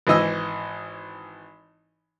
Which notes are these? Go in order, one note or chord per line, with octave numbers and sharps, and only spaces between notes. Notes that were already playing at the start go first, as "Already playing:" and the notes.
G#1 E3 D#5 E6